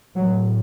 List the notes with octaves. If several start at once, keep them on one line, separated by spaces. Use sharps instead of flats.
A2 F#3